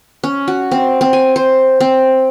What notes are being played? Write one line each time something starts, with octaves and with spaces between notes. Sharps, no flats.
C#4
F#4
C4
C4
G#5
C5
C4